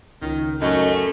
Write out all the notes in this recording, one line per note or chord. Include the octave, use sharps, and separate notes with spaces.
C#2 D#3
F#2 A3 D#5